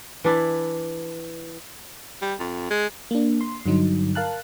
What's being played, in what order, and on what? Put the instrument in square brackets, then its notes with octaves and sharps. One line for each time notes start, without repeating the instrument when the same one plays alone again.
[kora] E3 D4 E4
[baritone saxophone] G3
F2
G#3
[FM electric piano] A#3 D4
C6
G2 D3 F#3 D#4
A#4 F5 A5 F#6